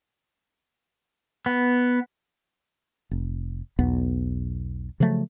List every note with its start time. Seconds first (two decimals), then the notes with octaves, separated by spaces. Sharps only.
1.46 B3
3.11 F1
3.79 B1 E2 B3
5.00 C#3 F3 F#3 A3